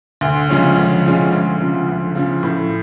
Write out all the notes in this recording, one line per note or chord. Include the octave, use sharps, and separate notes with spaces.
D2
C#3 F3 G#3 C#4
D2
C#3 F3 G#3 C#4
D2
C#3 F3
D2
C#3 F3
A2